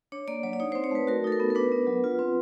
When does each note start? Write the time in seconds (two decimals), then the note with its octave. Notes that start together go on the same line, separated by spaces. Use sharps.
0.12 D4 C#5
0.28 A#3 D5
0.43 F#3 C#5
0.53 D5
0.60 D#4 C#5
0.72 C4 C5
0.84 C#5
0.91 A3 B4
1.07 F#4 A#4
1.24 D#4 A4
1.32 A#4
1.40 B3
1.50 A#4
1.55 D4 B4
1.72 B3
1.87 F#3
2.04 F4
2.19 C4